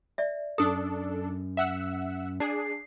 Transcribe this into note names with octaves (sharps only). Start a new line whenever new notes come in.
D5 E5
F#2 D4 A4 D#6
E5 F#5 E6
D4 G#4 C7